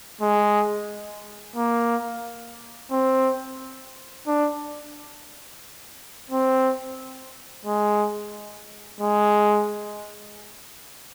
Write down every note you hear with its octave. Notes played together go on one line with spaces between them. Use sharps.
G#3
A#3
C4
D4
C4
G#3
G#3